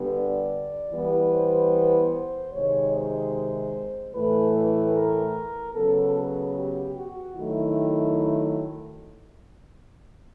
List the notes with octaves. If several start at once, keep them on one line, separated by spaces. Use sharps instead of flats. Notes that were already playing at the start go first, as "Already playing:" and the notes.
Already playing: D3 G3 B3
D5
E3 G3 B3
C5
C5
C3 D#3 G#3 C#5
C5
A2 E3 A3 B4
B4
A#4
C#3 F#3 B3 A4
G#4
G4
F#4
D#3 F#3 A3 E4